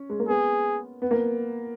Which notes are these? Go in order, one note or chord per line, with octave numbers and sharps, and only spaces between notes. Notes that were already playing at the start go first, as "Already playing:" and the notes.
Already playing: C#4
G#3
A#3
B3 G#4
B3
A#3